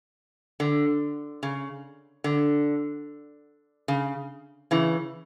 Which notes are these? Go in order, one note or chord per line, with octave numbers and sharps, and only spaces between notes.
D3
C#3
D3
C#3
C#3 E3